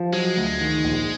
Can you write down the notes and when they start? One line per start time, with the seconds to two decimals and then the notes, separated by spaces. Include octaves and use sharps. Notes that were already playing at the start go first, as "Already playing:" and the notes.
Already playing: F3
0.13 F#3 G#3
0.37 D2
0.60 D#3
0.84 A#1